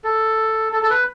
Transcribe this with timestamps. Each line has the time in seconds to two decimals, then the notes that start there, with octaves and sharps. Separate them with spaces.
0.04 A4
0.72 A4
0.83 A4
0.90 B4